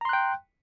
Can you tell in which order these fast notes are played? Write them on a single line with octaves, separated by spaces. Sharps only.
A#5 C6 F#6 G5